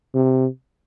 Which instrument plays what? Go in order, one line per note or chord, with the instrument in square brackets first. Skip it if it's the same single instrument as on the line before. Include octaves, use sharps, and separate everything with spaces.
[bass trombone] C3